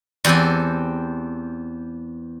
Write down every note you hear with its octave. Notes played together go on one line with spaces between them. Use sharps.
E2 C4 G4 A4 G#5